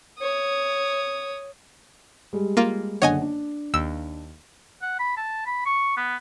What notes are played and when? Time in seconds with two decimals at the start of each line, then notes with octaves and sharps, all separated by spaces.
0.20 C#5 D#6
2.33 G3 G#3
2.57 A#3 F4
3.02 F#1 D3 C#5 D#5 F#5 G#5
3.21 D4
3.74 D#2 E6 E7
4.82 F#5
4.99 B5
5.17 A5
5.46 B5
5.66 C#6
5.97 B3